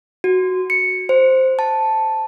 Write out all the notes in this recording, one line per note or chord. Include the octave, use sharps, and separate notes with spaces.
F#4
C#7
C5
A5